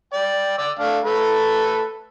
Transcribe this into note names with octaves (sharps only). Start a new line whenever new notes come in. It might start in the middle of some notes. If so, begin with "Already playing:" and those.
D5 G5
D5 D6 E6
A3 D4 F5
A3 A4 B4